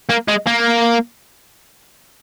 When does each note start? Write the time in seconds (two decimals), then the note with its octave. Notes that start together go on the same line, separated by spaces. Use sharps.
0.09 A#3
0.28 G#3
0.47 A#3